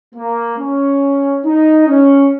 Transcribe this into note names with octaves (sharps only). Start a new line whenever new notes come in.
A#3
C#4
D#4
C#4